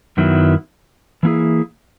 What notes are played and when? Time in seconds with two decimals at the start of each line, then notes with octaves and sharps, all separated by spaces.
0.17 F#2 D#3 F#3 B3 E4
1.23 E3 A#3 E4 G#4